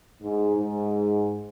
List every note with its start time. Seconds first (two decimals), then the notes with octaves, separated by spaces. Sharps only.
0.23 G#2
0.57 G#2